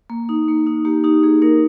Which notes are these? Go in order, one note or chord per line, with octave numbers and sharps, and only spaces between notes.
A#3
D#4
A#3
D#4
A#3 G4
D#4 G4
A#3 G#4
A#3 D#4 A#4